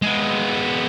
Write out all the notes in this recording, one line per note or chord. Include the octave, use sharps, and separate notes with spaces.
G#3 B3